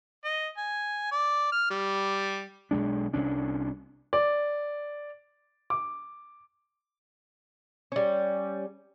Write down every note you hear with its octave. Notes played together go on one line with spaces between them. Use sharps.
D#5
G#5
D5
F6
G3
B1 G#3 D4
C2 C#4 D4
D5
D6
G3 C#4